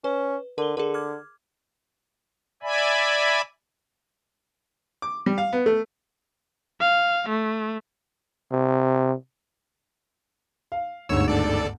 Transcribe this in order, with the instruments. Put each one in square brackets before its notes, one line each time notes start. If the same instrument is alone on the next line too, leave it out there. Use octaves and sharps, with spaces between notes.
[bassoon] C#4 [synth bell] B4
[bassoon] D3 [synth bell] A#4 G7
[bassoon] D3 [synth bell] G#4 A#4
[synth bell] D6 F6 G#6
[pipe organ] D5 E5 G#5 B5
[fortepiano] D6
G3
F5
B3
A3
[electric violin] F5
A3
[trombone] C3
[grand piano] F5
[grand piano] G1 D2 G#2 [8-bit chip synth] C#5 E6
[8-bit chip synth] D3 A4 D5